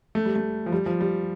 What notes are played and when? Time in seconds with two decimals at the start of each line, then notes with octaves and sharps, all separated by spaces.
0.15 A3
0.25 G3
0.36 A3
0.66 F3
0.72 G3
0.86 F3
1.01 G3